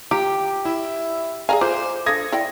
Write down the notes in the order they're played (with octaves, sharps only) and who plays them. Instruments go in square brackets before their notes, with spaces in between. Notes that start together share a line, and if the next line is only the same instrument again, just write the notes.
[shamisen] F4 A#5 [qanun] G4 [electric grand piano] D6
[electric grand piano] E4 [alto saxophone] E5
[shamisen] G#4 D5 F5 [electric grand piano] G#5 A#5
[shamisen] F4 [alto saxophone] C5 [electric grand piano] D6
[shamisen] D3 F5 [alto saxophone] A4 [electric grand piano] D#6 G#6 A#6
[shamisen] E4 D5 G5